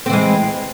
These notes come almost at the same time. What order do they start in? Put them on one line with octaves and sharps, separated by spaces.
C4 E3 G#3